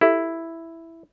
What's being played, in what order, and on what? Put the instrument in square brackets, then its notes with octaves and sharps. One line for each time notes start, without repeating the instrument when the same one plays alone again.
[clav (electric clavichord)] E4 [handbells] G4 A4 E5